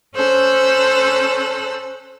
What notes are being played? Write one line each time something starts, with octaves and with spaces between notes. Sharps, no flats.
C#4 A4 C5 E6 F#6